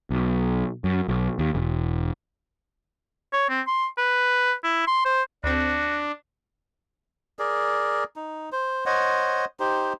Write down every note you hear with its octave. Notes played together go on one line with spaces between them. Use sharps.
B1
F#2
B1
D#2
E1
C#5
C4
C6
B4
E4
C6
C5
D2 C4 D4 F#4
G#4 A#4 D5
D#4
C5
C5 C#5 D#5 F#5
D#4 G4 C5